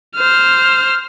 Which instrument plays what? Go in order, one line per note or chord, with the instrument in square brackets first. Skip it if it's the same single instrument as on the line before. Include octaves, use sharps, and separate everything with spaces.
[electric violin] C5 F6